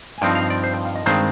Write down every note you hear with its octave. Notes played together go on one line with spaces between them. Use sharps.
G#5
G2 F3 C4 D#4 G5
F5
D5
C5
G5
F5
D#5
G2 D#3 G#3 C4 C5